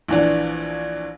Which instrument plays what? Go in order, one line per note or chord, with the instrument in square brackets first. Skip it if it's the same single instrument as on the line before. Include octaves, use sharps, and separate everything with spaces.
[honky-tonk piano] A#1 E3 D4